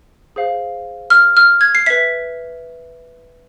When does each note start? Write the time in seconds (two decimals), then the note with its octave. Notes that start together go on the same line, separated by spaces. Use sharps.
0.36 G#4 C5 F5
1.10 F6
1.37 F6
1.61 G#6
1.75 C7
1.86 B4 E5 B6